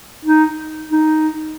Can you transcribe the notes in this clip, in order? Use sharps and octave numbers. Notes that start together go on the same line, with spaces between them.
D#4
D#4